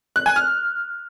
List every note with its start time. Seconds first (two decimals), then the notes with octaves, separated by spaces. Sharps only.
0.16 F#6
0.26 G#5
0.36 F6